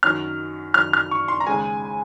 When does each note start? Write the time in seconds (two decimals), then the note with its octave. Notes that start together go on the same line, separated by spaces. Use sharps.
0.03 F#2 D#3 F#3 F6
0.74 F#2 D#3 F#3 F6
0.93 F6
1.11 C#6
1.28 C6
1.40 A#5
1.47 D#2 C#3 G#3 G#5